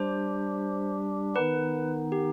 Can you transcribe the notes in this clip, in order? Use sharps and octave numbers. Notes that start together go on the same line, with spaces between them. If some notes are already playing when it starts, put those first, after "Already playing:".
Already playing: G3 D4 G4 C5
D#3 B3 D#4 B4
G4